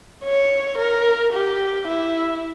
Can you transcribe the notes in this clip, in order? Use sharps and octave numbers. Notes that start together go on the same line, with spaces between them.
C#5
A#4
G4
E4